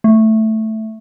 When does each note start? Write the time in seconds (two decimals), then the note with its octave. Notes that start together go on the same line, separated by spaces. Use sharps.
0.04 A3